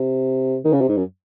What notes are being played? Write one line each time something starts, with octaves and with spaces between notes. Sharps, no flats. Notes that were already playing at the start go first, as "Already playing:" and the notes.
Already playing: C3
D#3
C#3
C3
G#2
F#2